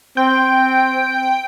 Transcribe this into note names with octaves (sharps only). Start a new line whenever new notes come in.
C4 G5